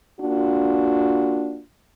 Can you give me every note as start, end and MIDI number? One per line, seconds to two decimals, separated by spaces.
0.20 1.61 58
0.20 1.61 62
0.20 1.61 65
0.20 1.61 66